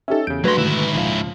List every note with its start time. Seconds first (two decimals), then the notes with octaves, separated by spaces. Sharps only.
0.08 C#4 D#4 G4 A4 E5
0.27 E2 C#3 G6 D7
0.44 G2 F#3 A3 F#4 B4 C6 G#6 A#6
0.58 G#2 D3 D#3 A3 E4
0.95 C#2 A#2 F3 F5